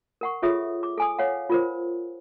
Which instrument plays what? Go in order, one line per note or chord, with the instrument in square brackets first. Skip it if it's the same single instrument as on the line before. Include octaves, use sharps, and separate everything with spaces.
[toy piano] A#4 F#5 C#6
F4 G#4 A4 C#5 E5 D#6
D6
A4 G#5 D#6
C#5 F5 F#5
F4 A#4 C5